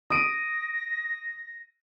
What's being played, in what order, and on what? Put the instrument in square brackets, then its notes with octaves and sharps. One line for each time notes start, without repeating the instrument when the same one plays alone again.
[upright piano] D#6 D7 D#7 [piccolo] A#6